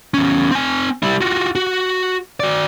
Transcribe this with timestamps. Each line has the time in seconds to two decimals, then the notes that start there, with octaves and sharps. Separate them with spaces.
0.14 E2 C#4
0.52 C4 G#5
1.03 G3 E4
1.21 F4 F#4
1.55 F#4
2.40 F#4 D5